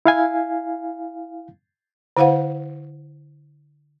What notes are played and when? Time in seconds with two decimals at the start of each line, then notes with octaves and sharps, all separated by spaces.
0.05 E4 F5 G#5
2.17 D3 E4 C5 F5 F#5